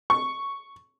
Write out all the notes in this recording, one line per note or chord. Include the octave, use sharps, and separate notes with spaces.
C#6